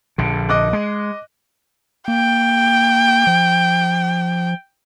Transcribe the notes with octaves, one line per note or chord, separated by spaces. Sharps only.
A#1 D3
D#5 D6 F#6
G#3
A#3 G5
F3